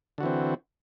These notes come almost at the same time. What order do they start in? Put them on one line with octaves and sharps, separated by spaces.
D3 F#4 E3 C4